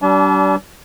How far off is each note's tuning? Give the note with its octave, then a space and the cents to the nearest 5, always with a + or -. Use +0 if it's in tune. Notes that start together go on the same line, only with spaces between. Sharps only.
G3 -35 D4 -25 A5 -45